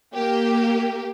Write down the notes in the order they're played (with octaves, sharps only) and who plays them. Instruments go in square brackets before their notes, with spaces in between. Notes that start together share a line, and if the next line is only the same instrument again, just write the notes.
[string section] A#3 G4